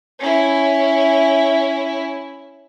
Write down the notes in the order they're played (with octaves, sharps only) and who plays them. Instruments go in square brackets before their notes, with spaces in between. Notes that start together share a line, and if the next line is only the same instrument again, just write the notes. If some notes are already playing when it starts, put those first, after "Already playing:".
[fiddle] C#4 E4